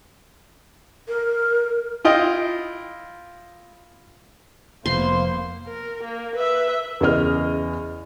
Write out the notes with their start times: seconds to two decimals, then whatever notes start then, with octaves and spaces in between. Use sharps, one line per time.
1.08 A#4
2.05 E4 F4 D#5 G5
4.86 F1 A#3 B3 C5 C6
5.68 A#4
6.03 A#3
6.36 B4 E5
7.01 E2 C#3 G#4 D#5 F6